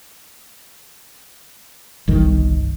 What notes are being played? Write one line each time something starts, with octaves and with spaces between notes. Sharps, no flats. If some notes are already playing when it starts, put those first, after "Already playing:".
G1 C2 D#3